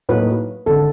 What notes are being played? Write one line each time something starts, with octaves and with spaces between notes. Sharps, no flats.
A2 F#3 A#3 D#4 B4
G#1 D3 A4